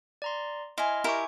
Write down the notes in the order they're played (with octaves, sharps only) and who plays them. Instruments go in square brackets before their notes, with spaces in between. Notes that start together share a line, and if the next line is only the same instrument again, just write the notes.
[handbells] D5 A#5 C6
[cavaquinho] E4 G#5 [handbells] D#5 C6 F6
[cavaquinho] E4 G4 A#4 [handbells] G#5 C#6